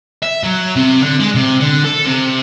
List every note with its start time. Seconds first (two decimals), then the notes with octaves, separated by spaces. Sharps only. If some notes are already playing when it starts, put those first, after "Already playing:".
0.22 E5
0.43 F#3
0.76 C3
1.01 D3
1.20 G#3
1.35 C3
1.60 D3
1.85 A4
2.06 C3